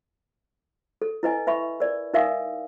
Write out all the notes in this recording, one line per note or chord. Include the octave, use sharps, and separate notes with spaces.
A4
E4 B4 D#5 G#5
B4 E5 B5 C#6
A#4 D5
D#4 A#4 E5 F5 G#5 D#6